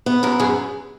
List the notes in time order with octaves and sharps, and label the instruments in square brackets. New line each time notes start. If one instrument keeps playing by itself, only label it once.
[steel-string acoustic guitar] B3
F#2 A#4
F#2 G#4